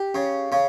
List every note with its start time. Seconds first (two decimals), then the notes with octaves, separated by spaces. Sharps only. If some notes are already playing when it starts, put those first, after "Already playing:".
Already playing: G4
0.15 C#3
0.52 C#3